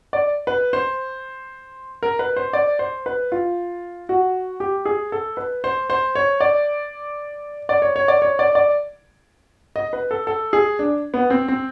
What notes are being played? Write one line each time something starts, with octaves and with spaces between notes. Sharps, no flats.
D5
B4
C5
A#4
B4
C5
D5
C5
B4
F4
F#4
G4
G#4
A4
B4
C5
C5
C#5
D5
D5
C#5
C#5
D5
C#5
D5
D5
D#5
B4
A4
A4
G#4
D4
B3
C4
C4